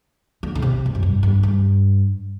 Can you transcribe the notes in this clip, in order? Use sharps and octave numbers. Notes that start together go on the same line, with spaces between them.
D3
D3
C3
E2
F#2
G2
G2
G2